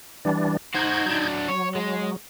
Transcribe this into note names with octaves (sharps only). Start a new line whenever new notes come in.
E3 G3 D4
D#4 F#4 C5 G6 G#6
F#3 D4
F#3 C#5
G#3